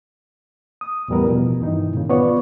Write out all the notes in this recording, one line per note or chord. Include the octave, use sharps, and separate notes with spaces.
D#6
E2 A2 E3 G3 B3 A#4
B2 F3
G2 D#3 E3 D#4
A#2 C#3
B3 F4 B4 C#5 D5 C#6